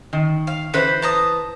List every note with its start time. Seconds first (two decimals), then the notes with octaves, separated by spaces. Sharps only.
0.13 D#3
0.47 F5
0.74 E3 B4 C5 B5
1.02 A5 A#5 D#6